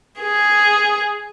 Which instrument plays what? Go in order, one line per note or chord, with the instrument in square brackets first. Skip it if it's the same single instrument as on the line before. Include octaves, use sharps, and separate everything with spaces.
[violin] G#4